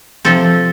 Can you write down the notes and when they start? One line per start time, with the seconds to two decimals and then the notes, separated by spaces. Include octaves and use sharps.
0.25 C3 F3 C4 A4